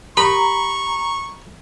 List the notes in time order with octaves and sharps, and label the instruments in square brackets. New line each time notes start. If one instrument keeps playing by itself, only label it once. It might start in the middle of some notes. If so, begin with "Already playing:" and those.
[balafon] G4 A#4 [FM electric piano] A#5 [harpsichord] B5 [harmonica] C#6